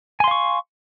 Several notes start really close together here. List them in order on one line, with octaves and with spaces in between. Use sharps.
G#5 C6 F5 C#6